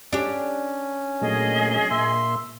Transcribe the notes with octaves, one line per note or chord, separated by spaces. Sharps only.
C#4 D4 G4
A#2 F#3 A3 G#4 D#5
A#2 E5 C6